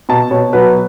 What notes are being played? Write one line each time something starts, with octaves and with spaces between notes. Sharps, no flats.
B2 A5
B2 C#5
F#3 B4